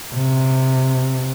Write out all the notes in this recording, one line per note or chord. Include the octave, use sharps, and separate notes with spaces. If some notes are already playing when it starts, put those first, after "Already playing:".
C3